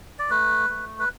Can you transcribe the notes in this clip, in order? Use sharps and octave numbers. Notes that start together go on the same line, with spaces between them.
D5
A3 B4
A3
B4